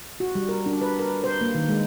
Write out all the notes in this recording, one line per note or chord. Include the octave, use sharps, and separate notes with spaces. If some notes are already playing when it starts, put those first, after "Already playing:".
F#4
G3
A#4
D4
B4
A#4
C5
A#3
D#3
G#3